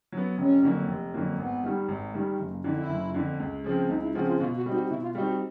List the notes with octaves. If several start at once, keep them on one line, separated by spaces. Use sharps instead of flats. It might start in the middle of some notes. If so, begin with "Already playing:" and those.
F#3
B3
F1 C#4
F2 D3 F#3 A#3
F1
F2 D3 F#3 A#3
G#1 B3
G2 D#3 G3
G#1
G2 D#3 G3
F#1 A3
A#3
F2 D3 D#4
E4
F#1
F2 D3
C#2
C#3 F3 G#3 C4
C#2 D#4
E4
C#3 F3 G#3 C4 F#4
F4
B2 F4
F#4
G3 C4 D#4
F#4
B2 E4
F4
G3 C4 D#4 F#4
F#4